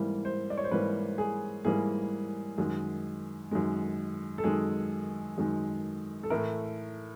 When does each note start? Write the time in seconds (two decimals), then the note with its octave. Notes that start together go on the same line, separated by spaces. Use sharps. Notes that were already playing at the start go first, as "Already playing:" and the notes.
Already playing: G#2 E3 G3 A#3
0.25 C5
0.50 D5
0.57 C#5
0.64 C5
0.71 G#2 E3 G3 A#3 B4
1.18 G#4
1.65 G#2 E3 G3 A#3 G#4
2.58 F#2 D#3 G#3
3.51 F#2 D#3 G#3
4.38 A4
4.44 F#2 D#3 G#3 G#4
5.38 F#2 D#3 G#3
6.23 A4
6.30 A2 E3 A3 A#4